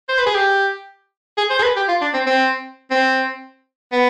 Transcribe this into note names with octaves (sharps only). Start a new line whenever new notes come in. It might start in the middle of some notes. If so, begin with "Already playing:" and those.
C5
B4
G#4
G4
G#4
C5
G#4
B4
G4
F4
D4
C4
C4
C4
B3